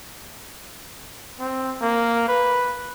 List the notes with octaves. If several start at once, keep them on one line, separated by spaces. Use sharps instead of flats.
C4
A#3
B4